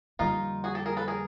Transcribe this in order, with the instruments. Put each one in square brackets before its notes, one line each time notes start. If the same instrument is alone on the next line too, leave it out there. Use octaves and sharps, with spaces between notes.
[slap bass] F2 D3 G3 A#3 [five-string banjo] D#4 F4
[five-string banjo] F#4 G#4
G4 A4
G#4 A#4
A4 B4
G#4 A#4